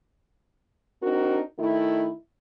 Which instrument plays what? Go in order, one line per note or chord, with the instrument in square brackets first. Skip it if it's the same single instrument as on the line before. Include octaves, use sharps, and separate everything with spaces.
[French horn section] C4 D4 D#4 F#4 A#4
D#3 A3 E4